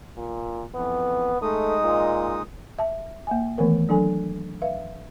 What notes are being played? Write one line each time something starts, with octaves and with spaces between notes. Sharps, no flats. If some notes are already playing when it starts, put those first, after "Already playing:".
A#2
F2 E3 B3
G#3 A3 D#4 D#6
A#2
E5 A5
A#3 E5 G#5
D#3 E3 A3 B3 A#4 B4
F#3 D4 A4 G#5
B4 E5 F5